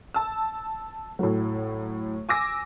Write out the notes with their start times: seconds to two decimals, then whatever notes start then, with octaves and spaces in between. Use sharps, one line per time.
0.14 A5 E6
1.19 A2 F#3
2.29 G#5 D6 E6 A#6